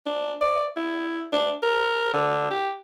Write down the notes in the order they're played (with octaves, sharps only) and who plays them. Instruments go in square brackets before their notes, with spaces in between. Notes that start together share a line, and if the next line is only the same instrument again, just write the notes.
[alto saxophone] D4
D5
E4
D4
A#4
D3
G4